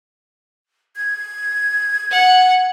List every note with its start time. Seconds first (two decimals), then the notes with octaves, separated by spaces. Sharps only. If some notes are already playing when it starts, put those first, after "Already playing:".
0.96 G#6
2.11 F#5